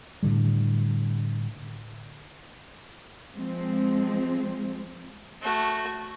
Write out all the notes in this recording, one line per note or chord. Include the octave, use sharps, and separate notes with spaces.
A2 D3 G3
F3 G#3 C4
A3 F#4